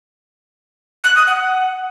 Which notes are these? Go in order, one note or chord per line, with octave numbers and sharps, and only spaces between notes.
F#6
D#6
F#5